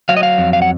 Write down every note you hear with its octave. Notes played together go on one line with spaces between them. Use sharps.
F#3 F5
D#5
F5
F2
F5
F#5